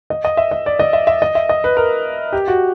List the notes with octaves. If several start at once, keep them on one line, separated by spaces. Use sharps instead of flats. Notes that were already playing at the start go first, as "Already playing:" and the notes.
D#5
D#5
E5
D#5
D5
D#5
E5
E5
D#5
E5
D#5
B4
A#4
G4
F#4